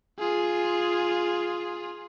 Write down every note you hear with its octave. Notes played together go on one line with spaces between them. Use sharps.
F4 G#4